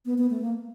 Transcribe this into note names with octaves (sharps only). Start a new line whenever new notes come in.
B3
B3
A3
A#3